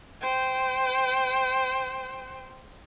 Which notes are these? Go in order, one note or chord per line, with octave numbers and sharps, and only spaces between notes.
C5 G5